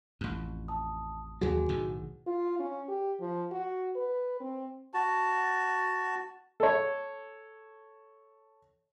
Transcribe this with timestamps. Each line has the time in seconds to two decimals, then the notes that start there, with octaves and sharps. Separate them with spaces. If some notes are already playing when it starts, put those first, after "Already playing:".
0.21 A1 F2
0.68 A5 D#6
1.41 D#2 F#3 F#4 G#4
1.69 B1 A2 D#3
2.27 F4
2.59 C#4
2.89 G4
3.20 F3
3.52 F#4
3.95 B4
4.40 C4
4.94 F#4 A5
6.60 A4 C#5